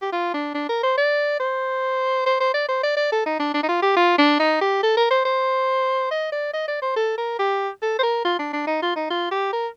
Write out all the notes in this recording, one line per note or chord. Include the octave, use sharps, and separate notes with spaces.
G4
F4
D4
D4
A#4
C5
D5
C5
C5
C5
D5
C5
D5
D5
A4
D#4
D4
D4
D#4
F4
G4
F4
D4
D#4
G4
A4
A#4
C5
C5
D#5
D5
D#5
D5
C5
A4
A#4
G4
A4
C5
A#4
F4
D4
D4
D#4
F4
D#4
F4
G4
A#4